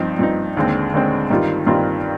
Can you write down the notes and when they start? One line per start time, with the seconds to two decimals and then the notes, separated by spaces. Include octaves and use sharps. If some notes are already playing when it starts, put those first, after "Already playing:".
Already playing: G2 F3 C4 D#4
0.19 G2 F3 C4 D#4
0.57 D#2 D3 G#3 C4
0.94 D#2 D3 G#3 C4
1.30 G2 D#3 G3 C4 F4
1.67 G2 D#3 G3 C4 F4